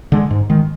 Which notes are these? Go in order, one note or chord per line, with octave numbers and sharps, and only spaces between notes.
D3 G#3
G#2
D#3 G#3